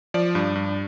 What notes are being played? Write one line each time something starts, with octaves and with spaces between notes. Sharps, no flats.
F3 D5
G2
G2